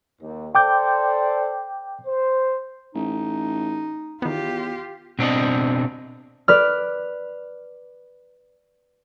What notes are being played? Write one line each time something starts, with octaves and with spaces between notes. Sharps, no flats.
D#2
A4 C5 D5 G5 D6 G6
C5
A1 D#4
E2 D#3 B3 F4 G4
B2 C4 D4 D#5
B4 D5 F6